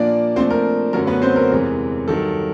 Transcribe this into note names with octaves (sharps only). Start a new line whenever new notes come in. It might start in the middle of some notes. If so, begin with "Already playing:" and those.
Already playing: A#2 F3 A#3 D4 D5
A#2 F3 A3 C4 D4 C5
A#4
F#2 D3 F#3 A3 C#4 A#4
B3 B4
C4 C5
A#4
E2 C3 E3 G#3
G2 D#3 F#3 A4